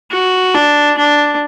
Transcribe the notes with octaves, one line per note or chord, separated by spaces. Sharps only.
F#4
D4
D4